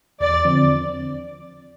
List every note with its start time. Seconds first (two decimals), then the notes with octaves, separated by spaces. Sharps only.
0.20 E2 D5
0.45 D3 F3 C4